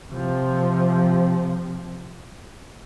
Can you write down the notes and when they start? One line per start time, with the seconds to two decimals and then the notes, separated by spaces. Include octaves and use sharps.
0.10 C3 F3